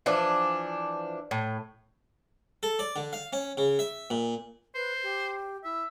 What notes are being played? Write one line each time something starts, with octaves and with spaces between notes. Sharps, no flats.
E3 F3 D4
A2
A4
D5
D3
F5
C#4
C#3
E5
A#2
B4 C5
G4
E4 E5